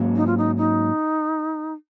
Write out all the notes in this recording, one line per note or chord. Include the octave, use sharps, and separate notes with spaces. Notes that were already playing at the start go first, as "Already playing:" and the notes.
Already playing: G#2 F#3 A#3 C#4
D#4
F4
D#4
D#4